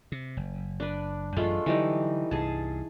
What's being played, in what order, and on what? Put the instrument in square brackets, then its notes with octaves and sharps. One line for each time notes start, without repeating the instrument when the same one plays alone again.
[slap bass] C3
F#1
[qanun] D4 B4
[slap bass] A1 F#2 [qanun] G#3 A3 F4
[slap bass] D3 F#3 [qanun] E3 G3 D#4
[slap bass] C2 G2 [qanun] G#4 A5